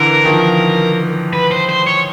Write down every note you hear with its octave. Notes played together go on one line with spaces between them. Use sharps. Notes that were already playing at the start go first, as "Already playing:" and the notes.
Already playing: D3 E3 A#4
D#3 F3
B4
C5
C5
C#5